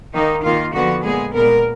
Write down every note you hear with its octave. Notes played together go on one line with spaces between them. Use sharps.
D#3 A#3 D#4
D#3 A#3 F4
D3 F3 B3 F#4
A#2 G#3 B3 G#4
A#2 G#3 B3 A#4